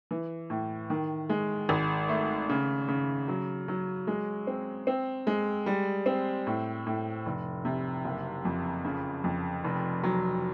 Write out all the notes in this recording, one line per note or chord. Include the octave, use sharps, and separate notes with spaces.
E3
A2
D#3
G#3
G#1
A3
C#3
C#3
F#3
F#3
G#3
C4
C4
G#3
G3
C4
A2
A2
F1
C3
F#1
F2
C#3
F2
F1
F#3